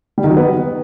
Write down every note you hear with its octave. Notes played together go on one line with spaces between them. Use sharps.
G3
D#3
F#3
B3